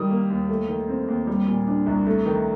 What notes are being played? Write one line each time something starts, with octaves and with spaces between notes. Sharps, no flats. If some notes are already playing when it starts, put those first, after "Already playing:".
Already playing: D#3 G3 D#6
A#3
D#2
A3
D#3
C4
D#2
G3
A#2
D4
C2
A3
D#3